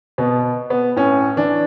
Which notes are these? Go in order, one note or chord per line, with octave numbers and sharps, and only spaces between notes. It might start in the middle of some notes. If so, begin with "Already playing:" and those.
B2 B3
B3
A2 C#4
E3 D4